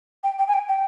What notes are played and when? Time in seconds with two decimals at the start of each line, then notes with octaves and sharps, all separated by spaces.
0.23 G5
0.39 G5
0.48 G#5
0.54 G5
0.69 G5